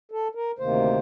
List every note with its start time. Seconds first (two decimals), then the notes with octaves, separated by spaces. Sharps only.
0.12 A4
0.35 A#4
0.59 D2 C3 D#3 A#3 C5